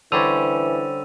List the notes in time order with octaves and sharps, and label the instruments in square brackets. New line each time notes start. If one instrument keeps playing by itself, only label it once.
[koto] D3 G3 C#4 [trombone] E3 [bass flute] C5 [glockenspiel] E6 D#7 F7